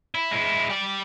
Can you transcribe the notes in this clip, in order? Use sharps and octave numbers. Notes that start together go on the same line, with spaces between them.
E4
G#3 E4
G4 D5